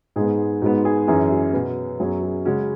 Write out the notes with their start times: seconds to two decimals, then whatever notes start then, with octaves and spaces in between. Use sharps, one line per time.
0.16 G#2 G#3 B3 G#4
0.62 G#2 G#3 B3 F#4
0.85 G#4
1.07 F#2 E3 C#4 G#4
1.31 F#4
1.53 B2 B3 F#4 B4
2.00 F#2 F#3 B3 G#4 C#5
2.23 G#4
2.45 C#3 G#3 C#4 F#4